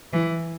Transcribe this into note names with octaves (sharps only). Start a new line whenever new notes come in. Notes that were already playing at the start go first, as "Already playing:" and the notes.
E3